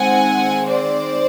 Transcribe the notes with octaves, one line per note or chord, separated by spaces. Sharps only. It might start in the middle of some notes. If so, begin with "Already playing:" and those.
Already playing: D#3 G#3 C4 F#5 G#5
C5 D5